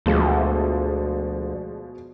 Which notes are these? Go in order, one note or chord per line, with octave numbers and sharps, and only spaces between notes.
D2 B2 F3 G#3